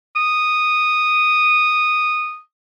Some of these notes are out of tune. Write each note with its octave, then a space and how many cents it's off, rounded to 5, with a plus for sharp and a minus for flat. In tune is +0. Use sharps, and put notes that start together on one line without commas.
D#6 -10